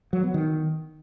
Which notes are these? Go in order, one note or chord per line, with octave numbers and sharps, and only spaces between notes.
F#3
B3
D#3